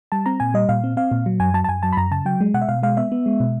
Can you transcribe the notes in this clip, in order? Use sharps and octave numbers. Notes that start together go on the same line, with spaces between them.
G3 A5
C4 A#5
A#2 G#5
G3 D#5
A#2 F5
C4
C4 F5
A#2
F#3
F#2 G#5
F#3 A5
A5
F#2 G#5
F#3 A5
B5
F#2 A#5
C#3 A5
F#3 G5
G#3
B2 F#5
E5
B2 F5
G#3 F5
B3 E5
B3
G#3
B2